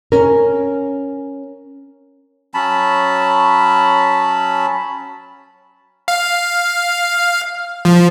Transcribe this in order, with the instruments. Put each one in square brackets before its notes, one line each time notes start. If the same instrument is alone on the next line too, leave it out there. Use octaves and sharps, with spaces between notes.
[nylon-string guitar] C#4 A#4
[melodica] F#3 C#4 A5 B5
[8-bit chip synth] F5
F3